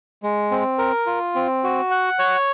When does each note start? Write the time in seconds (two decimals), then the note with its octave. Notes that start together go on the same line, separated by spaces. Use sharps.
0.23 G#3
0.51 C4
0.78 A#4
1.06 F4
1.35 C4
1.64 F#4
1.91 F#5
2.19 C#5